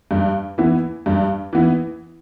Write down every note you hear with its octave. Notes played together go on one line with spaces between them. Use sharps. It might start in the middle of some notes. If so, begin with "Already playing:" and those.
G2
E3 B3 E4
G2
E3 B3 E4